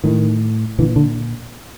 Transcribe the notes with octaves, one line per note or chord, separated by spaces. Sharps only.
A2 D#3
A#2 D3 E3
D3